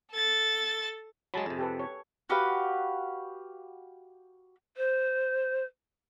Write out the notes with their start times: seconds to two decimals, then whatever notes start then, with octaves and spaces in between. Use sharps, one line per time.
0.13 A4 A6
1.34 F#3 G#3 G#4 A5 B5
1.46 F2 C3
1.59 G4 A4 B4
1.79 C#5
2.29 F#4 G4 B4 F5
4.77 C5